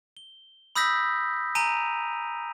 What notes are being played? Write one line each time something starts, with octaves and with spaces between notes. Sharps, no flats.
G7
B5 D#6 E6 G6 A#6 B6
G#5 A#5 D7 D#7 F7